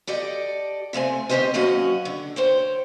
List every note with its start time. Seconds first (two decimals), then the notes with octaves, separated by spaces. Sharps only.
0.07 G4 A4 D5 D#5
0.93 C3 A3 C4 G#5
1.29 D#3 C4 C#4 G4 C5 D#5
1.54 D#2 F#3 C#4 D#5 F#5
2.05 D3
2.36 C5 C#5 G5